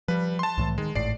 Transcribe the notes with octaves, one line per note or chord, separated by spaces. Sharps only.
F3 G3 B4
A5 C6
C2 A2 E3
D#3 G#3
G#1 A2 D5 C7